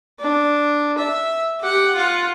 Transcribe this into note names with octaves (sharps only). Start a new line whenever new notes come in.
D4
E5
G4 F#5
F4 F#5